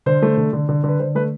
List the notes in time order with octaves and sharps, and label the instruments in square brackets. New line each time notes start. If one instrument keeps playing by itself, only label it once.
[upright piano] D3 C5
A3
D3
D3
D3
D3 B4
D3 C5
A3 B4